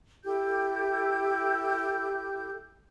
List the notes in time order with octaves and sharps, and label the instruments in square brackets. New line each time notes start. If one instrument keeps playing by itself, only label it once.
[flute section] E4 G4 A4 G6